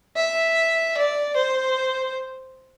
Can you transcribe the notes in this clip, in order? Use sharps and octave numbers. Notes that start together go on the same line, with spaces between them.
E5
D5
C5